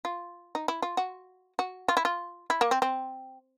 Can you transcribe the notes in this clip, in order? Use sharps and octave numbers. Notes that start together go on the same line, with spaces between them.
F4
D#4
E4
F4
F#4
F#4
F4
E4
F4
E4
A#3
C4
C4